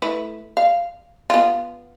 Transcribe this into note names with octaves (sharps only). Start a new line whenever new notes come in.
A3 E4 B4
F5
B3 F4